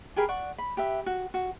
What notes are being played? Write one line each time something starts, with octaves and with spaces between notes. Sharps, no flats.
G4 G#4 A#4 B5
D5 F#5 C#6
B5
G4 B4 E5
F#4
F#4